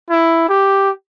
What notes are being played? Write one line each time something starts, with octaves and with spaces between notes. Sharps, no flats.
E4
G4